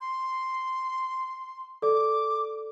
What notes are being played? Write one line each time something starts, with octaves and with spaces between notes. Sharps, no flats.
C6
A4 D5 D6